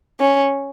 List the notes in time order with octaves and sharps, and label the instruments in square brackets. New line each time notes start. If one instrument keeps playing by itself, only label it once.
[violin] C#4